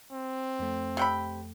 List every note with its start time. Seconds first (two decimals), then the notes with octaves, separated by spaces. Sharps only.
0.12 C4
0.59 F2 A3
0.97 C3 G5 B5